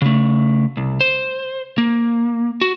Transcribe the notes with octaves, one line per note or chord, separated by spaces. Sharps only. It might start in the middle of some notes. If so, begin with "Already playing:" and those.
C#3 A3
C2
C5
A#3
F#4